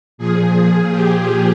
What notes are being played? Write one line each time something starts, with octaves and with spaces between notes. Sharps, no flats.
A#2 F3 G#4
G4